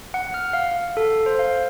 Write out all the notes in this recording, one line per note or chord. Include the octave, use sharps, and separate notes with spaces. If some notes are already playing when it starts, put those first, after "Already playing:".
F#5
F6
F5
A4
C5
F5